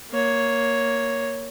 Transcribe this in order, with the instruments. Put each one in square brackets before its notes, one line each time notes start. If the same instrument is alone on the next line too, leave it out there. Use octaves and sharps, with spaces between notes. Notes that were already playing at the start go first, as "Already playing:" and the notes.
[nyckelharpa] A#3 C#5